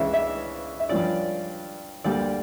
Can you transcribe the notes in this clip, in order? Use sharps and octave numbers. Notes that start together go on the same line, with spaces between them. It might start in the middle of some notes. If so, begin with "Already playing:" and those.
Already playing: C#2 C#3 E3 C#5 E5
E5
E5
G2 F3 C#4 D5
D2 D3 G3 A#3 D5